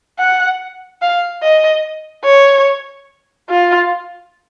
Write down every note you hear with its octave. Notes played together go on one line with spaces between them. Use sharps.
F#5
F5
D#5
C#5
F4